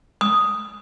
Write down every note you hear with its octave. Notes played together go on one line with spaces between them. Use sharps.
D#6